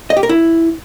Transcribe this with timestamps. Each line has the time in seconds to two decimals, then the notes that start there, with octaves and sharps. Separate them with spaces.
0.10 D#5
0.17 G4
0.23 A#4
0.29 E4